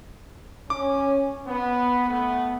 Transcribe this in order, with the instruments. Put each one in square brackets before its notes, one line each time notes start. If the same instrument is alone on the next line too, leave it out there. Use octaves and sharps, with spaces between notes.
[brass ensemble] C#4 [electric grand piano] D6
[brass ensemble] B3
A3 B3